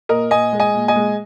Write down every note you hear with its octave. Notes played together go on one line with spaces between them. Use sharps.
A#2 A#4 D#5
A#2 D#5 G#5
G#3
D#5 G#5
A#2
D#5 G#5
G#3